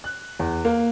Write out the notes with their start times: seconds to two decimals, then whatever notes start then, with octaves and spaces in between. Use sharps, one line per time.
0.04 F#6
0.39 E2
0.65 A#3